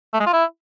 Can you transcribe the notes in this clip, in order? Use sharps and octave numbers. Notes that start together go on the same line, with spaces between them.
A3
G#3
F4
E4